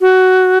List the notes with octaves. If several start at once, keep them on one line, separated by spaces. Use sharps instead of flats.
F#4